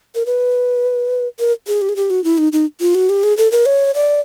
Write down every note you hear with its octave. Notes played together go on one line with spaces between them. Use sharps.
A#4
B4
A#4
G#4
G4
G#4
G4
F#4
E4
D#4
D#4
F4
F#4
G4
G#4
A4
A#4
C#5
D5